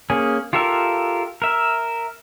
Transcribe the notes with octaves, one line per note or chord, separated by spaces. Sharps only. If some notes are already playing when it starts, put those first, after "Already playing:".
A#3 C#4 G#4
F4 G4 A4 A#4 E5
A#4 E5